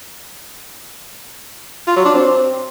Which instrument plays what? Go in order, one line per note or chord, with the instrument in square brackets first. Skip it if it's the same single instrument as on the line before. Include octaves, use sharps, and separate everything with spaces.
[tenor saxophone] F4
F#3
D4
C4